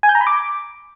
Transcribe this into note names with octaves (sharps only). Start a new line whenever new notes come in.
G#5
G6
A#5
B5
D6